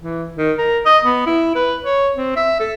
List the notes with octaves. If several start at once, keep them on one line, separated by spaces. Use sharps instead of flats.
E3
D#3
A#4
D#5
B3
E4
B4
C#5
C4
E5
A4